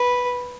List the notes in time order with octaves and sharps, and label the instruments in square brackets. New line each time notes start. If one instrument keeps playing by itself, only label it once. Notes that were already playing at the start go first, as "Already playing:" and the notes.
Already playing: [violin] B4